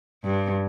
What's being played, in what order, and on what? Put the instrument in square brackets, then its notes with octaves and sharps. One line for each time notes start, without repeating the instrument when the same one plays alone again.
[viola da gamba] G2